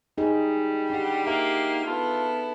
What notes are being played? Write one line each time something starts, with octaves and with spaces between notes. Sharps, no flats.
G3 D#4 G#4
D4 D#4 G4 F#5 C6
A#3 E5
B3 E4 F4 A4